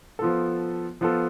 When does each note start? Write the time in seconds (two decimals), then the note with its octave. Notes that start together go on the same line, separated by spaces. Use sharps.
0.19 F3 B3 F4 A4
1.01 F3 B3 F4 A4